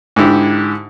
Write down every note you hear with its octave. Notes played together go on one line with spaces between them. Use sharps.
G#2 D3 E4 G4